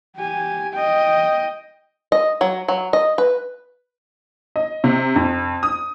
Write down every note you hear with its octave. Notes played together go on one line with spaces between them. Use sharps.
G4 G#5
D#5 G5
D#5
F#3
F#3
D#5
B4
D#5
C3
F2
D#6